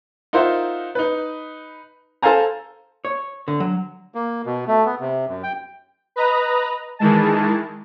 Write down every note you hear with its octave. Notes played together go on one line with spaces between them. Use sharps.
D#4 F4 A#4 C5 E5 F#5
D#4 B4
A4 C5 F5 G#5 A#5
C#5
D3
F#3
A#3
B2
A3
B3
C3
F#2
G5
B4 D#5 A#5
D#3 E3 G#3 A5